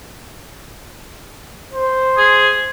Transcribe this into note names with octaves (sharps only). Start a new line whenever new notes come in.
C5
G#4